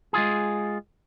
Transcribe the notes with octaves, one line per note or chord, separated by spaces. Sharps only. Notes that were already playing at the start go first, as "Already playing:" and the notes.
G#3 F4 G#4